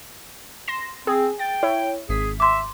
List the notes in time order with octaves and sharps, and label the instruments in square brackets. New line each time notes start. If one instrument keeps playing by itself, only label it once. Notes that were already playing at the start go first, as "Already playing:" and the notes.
[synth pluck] C6 A#6 E7
[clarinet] C4 [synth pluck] G#4
[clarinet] G5 [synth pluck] A6
[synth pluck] E4 C#5
[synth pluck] G#1 B6 [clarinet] G#4
[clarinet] E5 [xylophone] C6 D6